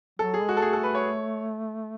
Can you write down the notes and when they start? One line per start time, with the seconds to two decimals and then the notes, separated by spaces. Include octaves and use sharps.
0.19 F#3 A4
0.34 G#4
0.41 G#3
0.49 F#4
0.57 A4
0.62 A3 G#4
0.73 A4
0.83 B4
0.95 C#5